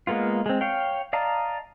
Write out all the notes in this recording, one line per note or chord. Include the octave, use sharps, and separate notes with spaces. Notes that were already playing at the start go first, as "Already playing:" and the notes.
G#3 A#3 B3 F4
G#3 C4
C#5 F5 G5
D5 D#5 F5 A5 A#5